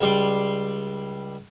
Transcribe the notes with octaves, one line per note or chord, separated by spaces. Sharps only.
C#2 G3 D5 C6